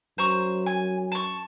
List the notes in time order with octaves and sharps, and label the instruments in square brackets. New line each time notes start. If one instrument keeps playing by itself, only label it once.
[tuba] F#2 [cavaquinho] C5 A#5 C#6
[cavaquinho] G#5
A5 C#6